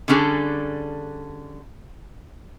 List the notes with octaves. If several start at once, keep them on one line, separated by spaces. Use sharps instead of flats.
D3 G3 C#4 D4 G#4 A4